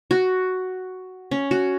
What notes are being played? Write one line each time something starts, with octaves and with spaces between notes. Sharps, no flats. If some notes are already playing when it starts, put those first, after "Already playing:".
F#4
C#4
F#4